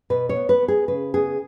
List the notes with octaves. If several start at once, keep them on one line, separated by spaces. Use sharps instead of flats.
B2 B4
C#5
B3
B4
B3
G#4
C#3 B4
B3 G#4